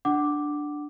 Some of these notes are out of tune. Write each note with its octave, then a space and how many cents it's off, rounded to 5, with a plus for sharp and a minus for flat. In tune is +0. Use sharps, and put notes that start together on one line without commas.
D4 +5 F#5 +15 D6 +0